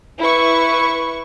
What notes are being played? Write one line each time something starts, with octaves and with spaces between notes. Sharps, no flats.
E4 B4 C#6